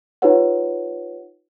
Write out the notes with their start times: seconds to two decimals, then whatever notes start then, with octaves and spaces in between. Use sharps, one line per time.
0.22 D#4 F4 G4 B4 C#5 F#5